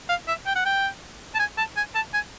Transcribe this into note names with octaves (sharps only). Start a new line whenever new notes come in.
F5
E5
G5
F#5
G5
A5
G#5
A5
G#5
A5
G#5